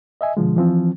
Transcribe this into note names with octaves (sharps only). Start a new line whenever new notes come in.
D#5 E5 G#5
B2 D3 F3 G#3
E3 F3 C4